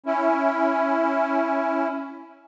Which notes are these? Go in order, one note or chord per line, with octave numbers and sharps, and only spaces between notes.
C#4 E4